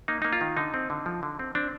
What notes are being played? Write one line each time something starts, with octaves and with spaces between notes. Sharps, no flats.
A#3 D#4
A#3 D#4
F4
D#3
D3 D#4
C4
D3
F3
D3
C4
C4 D4